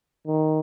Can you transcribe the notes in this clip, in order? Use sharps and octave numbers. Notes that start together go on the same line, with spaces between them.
D#3